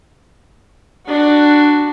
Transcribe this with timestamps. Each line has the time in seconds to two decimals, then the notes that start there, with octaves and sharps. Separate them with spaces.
1.06 D4 F#4